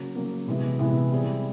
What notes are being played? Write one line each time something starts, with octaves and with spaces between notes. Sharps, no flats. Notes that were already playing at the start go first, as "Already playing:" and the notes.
Already playing: C#3 F#3 A#3
C#3 F#3 A#3
C3 E3 G#3 B3 E4
C3 E3 G#3 B3 E4
G3 C4 E4 G#4